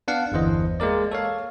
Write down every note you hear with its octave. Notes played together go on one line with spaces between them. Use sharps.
B3 D4 F5 F#5
G1 E2 E3 C5 D#5
G#3 A#3 A#4 D5
A4 C#5 F5